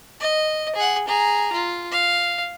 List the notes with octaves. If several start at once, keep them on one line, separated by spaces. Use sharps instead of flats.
D#5
G#4 F#5
G#4 A#5
F4
F5